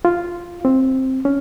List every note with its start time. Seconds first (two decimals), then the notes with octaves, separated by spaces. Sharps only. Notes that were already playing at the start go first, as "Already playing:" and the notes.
0.05 F4
0.65 C4
1.25 C#4